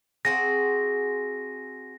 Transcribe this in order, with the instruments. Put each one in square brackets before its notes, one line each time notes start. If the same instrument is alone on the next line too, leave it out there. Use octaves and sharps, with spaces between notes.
[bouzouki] C4 F#4 G#4 [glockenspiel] A#6